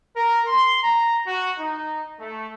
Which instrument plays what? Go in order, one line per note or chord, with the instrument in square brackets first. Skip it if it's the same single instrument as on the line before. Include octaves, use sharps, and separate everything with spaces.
[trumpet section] A#4
C6
A#5
F#4
D#4
A3